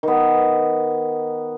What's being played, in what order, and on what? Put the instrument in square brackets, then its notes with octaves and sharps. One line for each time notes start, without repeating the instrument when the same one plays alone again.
[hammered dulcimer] D#3 B3